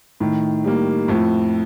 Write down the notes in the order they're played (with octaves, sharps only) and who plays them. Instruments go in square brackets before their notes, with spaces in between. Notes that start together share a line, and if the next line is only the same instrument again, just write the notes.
[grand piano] A2 [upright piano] D#3
[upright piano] G3 A#3
[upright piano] F2 [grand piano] A2